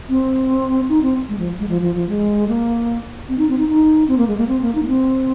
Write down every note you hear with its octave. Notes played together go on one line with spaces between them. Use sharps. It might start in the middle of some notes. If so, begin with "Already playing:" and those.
C4
D#4
C4
G#3
F3
G#3
F3
F3
F3
G#3
A#3
C4
D#4
C4
D#4
D#4
C4
A#3
G#3
A#3
C4
A#3
D#4
A#3
C4